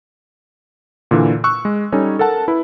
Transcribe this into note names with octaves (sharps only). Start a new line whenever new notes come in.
A#2 D3 E3
C#6 E6 F#6
G#3
G3 C#4 D#4 A4 C#5
A4 A#4 F#5 A5
E4 B4